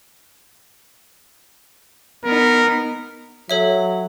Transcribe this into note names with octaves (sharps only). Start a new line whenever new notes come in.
B3 D#4 A#4
F#3 A4 C#5 E5